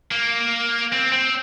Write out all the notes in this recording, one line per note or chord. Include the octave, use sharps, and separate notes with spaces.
A#3
C4
C4